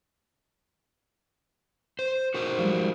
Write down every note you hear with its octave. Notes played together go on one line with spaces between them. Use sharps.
C5
F#4 A#4 C5
F3 G3 G#3